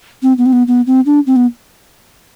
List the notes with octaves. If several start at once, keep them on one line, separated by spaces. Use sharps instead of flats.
C4
B3
C4
B3
B3
C4
D4
C4
B3